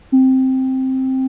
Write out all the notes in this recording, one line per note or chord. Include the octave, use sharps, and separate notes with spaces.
C4